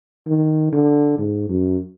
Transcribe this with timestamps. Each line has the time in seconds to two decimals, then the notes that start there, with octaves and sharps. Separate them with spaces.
0.27 D#3
0.72 D3
1.18 G#2
1.49 F#2